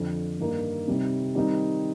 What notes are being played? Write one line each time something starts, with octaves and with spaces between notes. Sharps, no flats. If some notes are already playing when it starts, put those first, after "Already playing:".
Already playing: F2 D3 F3
G2 D#3 A#3 D#4
C3 G3 C4 D#4
D#3 G3 C4 D#4